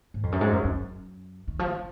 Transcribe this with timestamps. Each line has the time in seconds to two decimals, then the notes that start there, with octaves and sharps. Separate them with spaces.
0.14 G#2
0.23 F2
0.32 F#2
0.41 G#2
0.53 F#2
0.64 F#2
1.47 D#3
1.59 F3
1.71 F3